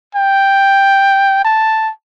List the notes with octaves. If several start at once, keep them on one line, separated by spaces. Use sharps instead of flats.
G5
A5